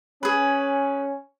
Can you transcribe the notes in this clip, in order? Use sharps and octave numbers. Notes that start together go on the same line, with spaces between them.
C#4 G#4 B4